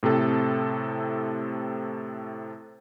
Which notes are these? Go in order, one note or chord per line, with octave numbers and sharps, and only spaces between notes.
A2 C3 C4 A4